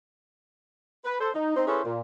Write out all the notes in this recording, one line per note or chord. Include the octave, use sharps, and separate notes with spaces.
B4
A4 C5
D#4
C4 D#4
C#4 E4 G#4 A4 B4 C5
A#2